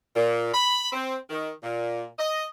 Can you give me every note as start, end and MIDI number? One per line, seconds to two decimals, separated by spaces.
0.16 0.52 46
0.54 0.91 83
0.93 1.16 60
1.30 1.51 51
1.63 2.04 46
2.19 2.44 75